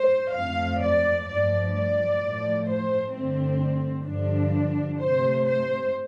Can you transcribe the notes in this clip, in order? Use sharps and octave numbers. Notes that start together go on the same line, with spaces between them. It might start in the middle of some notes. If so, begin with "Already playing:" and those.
Already playing: C5
F2 F3 A3 F5
D5
G2 F3 A3 D5
D5
A2 F3 A3
C5
G2 D3 A3 C4
G2 D3 F3 D4
C3 A3 C5
C5